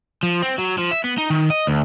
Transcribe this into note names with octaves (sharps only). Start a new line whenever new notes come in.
F3
C4
F#3
F3
E5
B3
D#4
D#3
D#5
D2